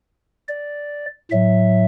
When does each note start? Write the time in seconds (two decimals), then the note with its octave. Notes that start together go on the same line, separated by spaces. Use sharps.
0.48 D5
1.31 A2 F#3 E5